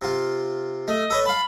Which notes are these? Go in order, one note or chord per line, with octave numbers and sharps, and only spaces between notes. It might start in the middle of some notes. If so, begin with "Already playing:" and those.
C3 F4
A3 D#5
A4 B4 C#5
F5 A5 B5